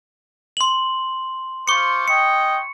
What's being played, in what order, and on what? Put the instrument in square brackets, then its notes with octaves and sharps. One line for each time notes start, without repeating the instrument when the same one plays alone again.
[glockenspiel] C6 F#7
[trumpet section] F4 C5 D6 [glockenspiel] C#6 C#7
[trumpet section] C#4 D#5 G5 [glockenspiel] C#7